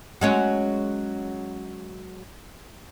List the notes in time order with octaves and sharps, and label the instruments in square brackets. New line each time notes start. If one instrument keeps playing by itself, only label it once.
[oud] F#3 G#3 C#4